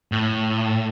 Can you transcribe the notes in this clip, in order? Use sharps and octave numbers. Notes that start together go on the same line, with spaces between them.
A2